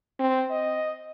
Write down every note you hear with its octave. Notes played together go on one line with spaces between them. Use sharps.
C4
D#5